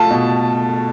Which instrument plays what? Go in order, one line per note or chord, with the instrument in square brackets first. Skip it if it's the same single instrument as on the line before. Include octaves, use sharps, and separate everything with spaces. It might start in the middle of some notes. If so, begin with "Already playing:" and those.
Already playing: [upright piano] A3 F4 A4 [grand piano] A5
[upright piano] B2